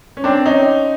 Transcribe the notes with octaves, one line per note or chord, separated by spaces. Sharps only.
C#4
C4 D4
C#4 D#4